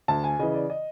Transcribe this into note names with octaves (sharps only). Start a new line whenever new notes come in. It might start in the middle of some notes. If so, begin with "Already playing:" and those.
D2 A5
G#5
C#3 E3 D#5
D5
D#5